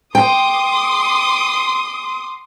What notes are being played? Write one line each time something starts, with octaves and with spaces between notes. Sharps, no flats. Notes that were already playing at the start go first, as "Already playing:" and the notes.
G5 C6 D6 D#6